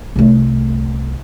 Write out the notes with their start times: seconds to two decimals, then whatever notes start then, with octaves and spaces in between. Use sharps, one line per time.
0.16 C2 A3